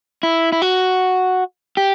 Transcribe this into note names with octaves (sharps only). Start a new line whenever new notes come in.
E4
E4
F#4
G4